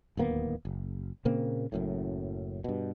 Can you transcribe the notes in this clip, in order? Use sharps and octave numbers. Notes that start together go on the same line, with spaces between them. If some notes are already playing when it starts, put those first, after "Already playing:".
D1 D#2 A#3 B3
F#1
A#2 C#3 A#3 C4
F#1 F#2 A2
G2 B2